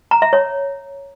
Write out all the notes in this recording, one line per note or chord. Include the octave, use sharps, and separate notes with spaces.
A#5
E5
C#5